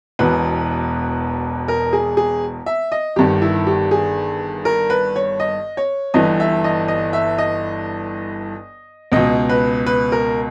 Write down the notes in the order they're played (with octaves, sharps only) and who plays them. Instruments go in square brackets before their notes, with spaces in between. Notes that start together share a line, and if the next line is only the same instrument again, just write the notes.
[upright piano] E1 E2 B2 B4
A#4
G#4
G#4
E5
D#5
G1 G2 D#3 G4
E4
G4
G#4
A#4
B4
C#5
D#5
C#5
G1 G2 E3 D#5
E5
D#5
D#5
E5
D#5
C#2 B2 D#5
B4
B4
A#4